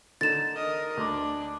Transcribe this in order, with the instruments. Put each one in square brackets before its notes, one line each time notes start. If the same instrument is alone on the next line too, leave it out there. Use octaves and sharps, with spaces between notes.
[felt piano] D3 D#4 [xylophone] A6 E7
[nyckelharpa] A#4 D#5
[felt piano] D2 D6 [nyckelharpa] D4